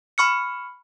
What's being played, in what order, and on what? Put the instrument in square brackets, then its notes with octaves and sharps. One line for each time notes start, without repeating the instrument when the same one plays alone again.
[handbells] B5 C#6 F6 C#7